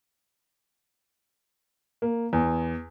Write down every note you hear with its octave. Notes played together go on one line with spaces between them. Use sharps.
A#3
E2